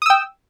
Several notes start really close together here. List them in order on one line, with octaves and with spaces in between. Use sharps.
D#6 E6 G5